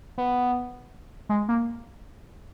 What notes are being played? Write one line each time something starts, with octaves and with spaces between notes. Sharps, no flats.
B3
G#3
A#3